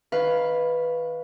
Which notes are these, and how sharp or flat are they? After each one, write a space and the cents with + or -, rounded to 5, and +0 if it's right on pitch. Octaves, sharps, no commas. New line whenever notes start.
D#3 +25 B4 +0 F5 +0